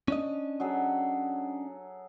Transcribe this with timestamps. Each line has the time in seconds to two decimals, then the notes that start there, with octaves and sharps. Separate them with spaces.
0.08 C#4 D4 D#5
0.60 F#3 G#4 A4